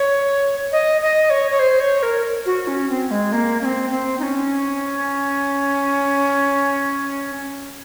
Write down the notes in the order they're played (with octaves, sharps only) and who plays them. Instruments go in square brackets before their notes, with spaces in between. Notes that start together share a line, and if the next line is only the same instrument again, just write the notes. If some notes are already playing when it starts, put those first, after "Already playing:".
Already playing: [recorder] C#5
D#5
D#5
C#5
C#5
C5
C#5
A#4
F#4
C#4
C4
G#3
A#3
C#4
C4
C4
D#4
C#4